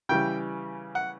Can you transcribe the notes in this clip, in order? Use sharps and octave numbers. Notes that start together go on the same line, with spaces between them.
C#3 E3 G3 G5
F#5